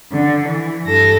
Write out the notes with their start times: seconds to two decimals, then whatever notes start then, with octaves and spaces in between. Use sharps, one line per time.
0.11 D3
0.46 E3
0.86 G2 A4 A#6